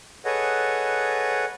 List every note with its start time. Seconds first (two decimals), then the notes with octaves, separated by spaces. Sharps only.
0.25 G#4 A4 B4 C#5 D#5 F#5